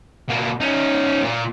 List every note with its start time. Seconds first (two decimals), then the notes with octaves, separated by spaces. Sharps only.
0.29 B2 A#3
0.60 C#4 D#4
1.22 A#2